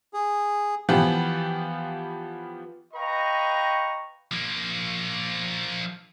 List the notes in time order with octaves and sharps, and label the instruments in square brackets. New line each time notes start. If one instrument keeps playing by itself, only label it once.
[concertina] G#4
[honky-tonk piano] E3 F3 B3 F4 G4
[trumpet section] B4 D#5 F5 G5 A#5 C#6
[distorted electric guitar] F3 A#3